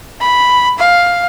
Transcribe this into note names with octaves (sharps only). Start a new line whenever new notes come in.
B5
F5